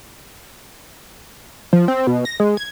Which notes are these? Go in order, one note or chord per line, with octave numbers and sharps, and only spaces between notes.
F3
C4
B2
A#6
G#3
G#6